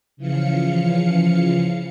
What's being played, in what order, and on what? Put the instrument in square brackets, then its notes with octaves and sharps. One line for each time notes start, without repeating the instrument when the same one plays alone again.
[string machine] C#3 E3 F3 F5 C#7